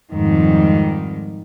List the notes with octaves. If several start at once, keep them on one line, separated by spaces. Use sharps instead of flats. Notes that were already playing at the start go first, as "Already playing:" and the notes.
F2 G#2 D#3 G3